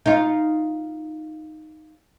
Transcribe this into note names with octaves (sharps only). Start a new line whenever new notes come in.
D#4 F4